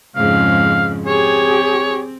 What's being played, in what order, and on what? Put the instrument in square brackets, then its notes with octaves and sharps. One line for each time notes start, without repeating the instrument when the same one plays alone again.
[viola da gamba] F2 G#2 C#3 [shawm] F5
[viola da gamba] C4 [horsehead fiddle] G4 G#4 [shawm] C#5